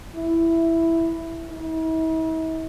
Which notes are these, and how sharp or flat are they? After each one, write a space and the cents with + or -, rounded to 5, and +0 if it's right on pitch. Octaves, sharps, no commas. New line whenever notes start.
E4 +5
E4 -45